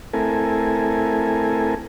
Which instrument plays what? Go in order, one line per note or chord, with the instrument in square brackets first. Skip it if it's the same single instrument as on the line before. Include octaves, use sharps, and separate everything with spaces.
[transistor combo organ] A3 C4 E4 A4 A#4 G#5